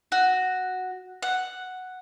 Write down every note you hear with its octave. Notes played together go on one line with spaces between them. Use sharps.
F#4
F#5